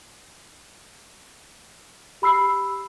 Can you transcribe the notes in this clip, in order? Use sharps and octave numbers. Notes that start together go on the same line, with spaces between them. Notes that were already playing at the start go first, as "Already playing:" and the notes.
G4 B5 E6 C7